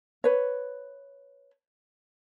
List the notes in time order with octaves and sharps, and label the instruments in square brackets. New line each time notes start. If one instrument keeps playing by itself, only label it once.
[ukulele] B4 C#5